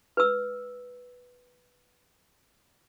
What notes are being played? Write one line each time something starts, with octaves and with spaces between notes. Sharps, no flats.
B4 E6